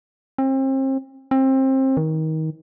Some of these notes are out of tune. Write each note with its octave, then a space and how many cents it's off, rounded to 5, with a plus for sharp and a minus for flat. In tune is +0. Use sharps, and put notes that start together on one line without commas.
C4 +35
C4 +25
D#3 +25